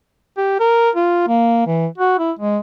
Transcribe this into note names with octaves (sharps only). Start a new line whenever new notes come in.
G4
A#4
F4
A#3
E3
F#4
E4
G#3